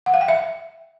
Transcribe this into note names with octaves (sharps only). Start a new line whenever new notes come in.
F#5
F5
G5
E5